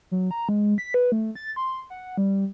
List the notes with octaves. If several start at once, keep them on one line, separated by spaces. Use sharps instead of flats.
F#3
A#5
G#3
B6
B4
A3
A6
C6
F#5
G3